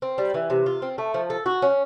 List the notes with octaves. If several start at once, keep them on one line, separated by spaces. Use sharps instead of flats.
C4
G3
E3
C3
F4
C4
A3
F3
A4
F#4
C#4